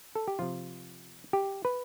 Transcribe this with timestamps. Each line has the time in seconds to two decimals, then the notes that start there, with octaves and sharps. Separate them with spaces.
0.15 A4
0.28 G4
0.39 C3 F3 F4
1.33 G4
1.65 B4